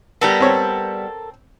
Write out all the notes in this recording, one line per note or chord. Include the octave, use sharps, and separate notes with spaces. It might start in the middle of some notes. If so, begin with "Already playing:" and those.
G3 B3 A4 A#4 A#5
C4 C#5